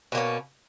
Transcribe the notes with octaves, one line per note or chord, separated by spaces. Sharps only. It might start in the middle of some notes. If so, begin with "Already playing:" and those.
B2 A#3 C#4